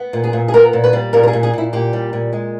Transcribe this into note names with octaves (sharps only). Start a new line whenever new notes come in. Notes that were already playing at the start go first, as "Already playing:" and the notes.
Already playing: B3
A#2
G#4
A#2
G#4
B3 A#4
A#2
B4
G3
A#2 A#4
A#4
G#4
A#2
G#4
A#2 E4
A#2 G4
G3
A#2
G#3